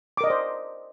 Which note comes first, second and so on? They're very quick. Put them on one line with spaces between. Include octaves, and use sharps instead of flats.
D6 A#4 D#5 D5 C5